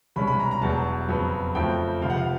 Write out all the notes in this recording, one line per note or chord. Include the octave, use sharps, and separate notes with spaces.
C2 B2 G#3 C#4 B5
B5
A#5
A#5
E1 E2 B2 F#3 A5
F2 C#3 F#3 B3
F2 C#3 F3 A3 G5
C#2 C3 F3 F5
F#5
F5